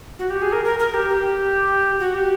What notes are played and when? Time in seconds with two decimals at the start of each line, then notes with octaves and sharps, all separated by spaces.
0.19 F#4
0.30 G4
0.42 G#4
0.52 A#4
0.65 A#4
0.79 A#4
0.94 G4
1.10 G4
1.99 F#4
2.14 G4